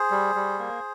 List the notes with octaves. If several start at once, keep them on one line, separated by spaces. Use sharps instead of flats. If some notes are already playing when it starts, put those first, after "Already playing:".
Already playing: G#4 C5
G3
G3
A#3